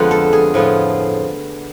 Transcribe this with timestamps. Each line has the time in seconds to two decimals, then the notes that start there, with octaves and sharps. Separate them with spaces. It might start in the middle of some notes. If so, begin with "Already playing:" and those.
Already playing: F2 D3 G#3 B3 F4 B4
0.11 A4
0.33 G#4
0.54 A2 F3 B3 F4